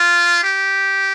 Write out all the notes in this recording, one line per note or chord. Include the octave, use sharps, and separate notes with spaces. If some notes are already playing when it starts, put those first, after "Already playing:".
Already playing: F4
G4